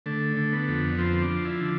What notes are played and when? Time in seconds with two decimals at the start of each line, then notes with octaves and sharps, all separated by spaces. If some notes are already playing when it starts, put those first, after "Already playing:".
0.06 D3 A3
0.37 D3
0.53 B3
0.68 F2
0.99 F3 C4
1.22 D4
1.30 F3
1.45 E4
1.60 D3